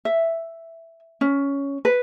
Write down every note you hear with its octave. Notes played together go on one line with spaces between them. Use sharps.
E5
C#4
B4